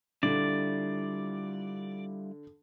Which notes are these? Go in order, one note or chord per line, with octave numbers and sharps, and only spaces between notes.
D3 G3 E4 F4 D5